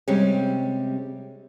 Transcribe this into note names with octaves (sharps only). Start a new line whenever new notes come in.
C3 G3 G#3 C4 C#4